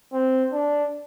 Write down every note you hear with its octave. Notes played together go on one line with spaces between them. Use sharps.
C4
D4